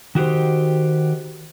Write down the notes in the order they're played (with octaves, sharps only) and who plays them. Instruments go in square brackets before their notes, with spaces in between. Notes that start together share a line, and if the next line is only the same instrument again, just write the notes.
[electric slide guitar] D#3 F#4 G4 C5